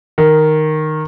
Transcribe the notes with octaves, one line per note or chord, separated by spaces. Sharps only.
D#3